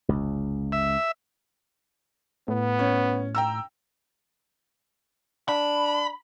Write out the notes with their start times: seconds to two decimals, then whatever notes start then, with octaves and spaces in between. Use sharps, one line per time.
0.09 F1 C#2
0.72 E5
2.48 A2 B3
2.79 C#4
3.35 G5 A#5 E6
5.48 D4 B5